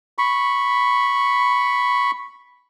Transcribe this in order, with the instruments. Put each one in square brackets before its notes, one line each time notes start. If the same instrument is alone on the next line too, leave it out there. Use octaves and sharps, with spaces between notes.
[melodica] B5 C#6